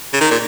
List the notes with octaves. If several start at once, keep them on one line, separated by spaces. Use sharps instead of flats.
C#3
D#3
A#2